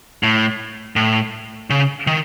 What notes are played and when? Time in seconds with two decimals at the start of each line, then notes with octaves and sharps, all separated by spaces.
0.23 A2
0.96 A2
1.70 C#3
2.07 D#3